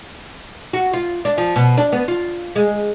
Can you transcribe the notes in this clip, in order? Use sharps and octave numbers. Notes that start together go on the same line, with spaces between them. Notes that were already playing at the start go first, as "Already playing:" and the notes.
F#4
F4
D4
F3
B2
D4
B3
F4
G#3